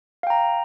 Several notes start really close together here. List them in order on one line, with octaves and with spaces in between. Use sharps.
F5 G5 A#5